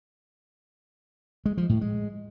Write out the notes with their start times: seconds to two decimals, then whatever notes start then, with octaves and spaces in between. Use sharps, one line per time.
1.46 G#3
1.58 F3
1.69 A2
1.81 G#3